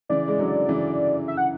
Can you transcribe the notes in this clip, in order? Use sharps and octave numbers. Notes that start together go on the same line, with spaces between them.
C#3 E3 D5
G#3
D3 F#3
C#3 E3
E5
F#5